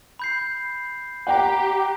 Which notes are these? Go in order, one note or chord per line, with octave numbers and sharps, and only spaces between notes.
B5 G6 C7
G4 F#5 G5 A#5